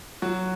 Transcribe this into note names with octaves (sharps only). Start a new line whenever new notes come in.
F#3 F#4